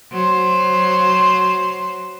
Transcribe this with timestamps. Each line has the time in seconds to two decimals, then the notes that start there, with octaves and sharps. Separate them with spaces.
0.12 F#3 C5